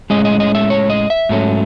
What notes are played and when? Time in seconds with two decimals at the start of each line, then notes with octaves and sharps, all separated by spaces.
0.10 A2 G#3 C#4 D#5
0.25 D#5
0.40 D#5
0.55 E5
0.70 C#5
0.90 D#5
1.10 E5
1.29 G#2 F#3 A3 C#4